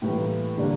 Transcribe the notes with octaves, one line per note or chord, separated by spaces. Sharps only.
A2 E3 G3 A#3
D3 G3 A#3 D4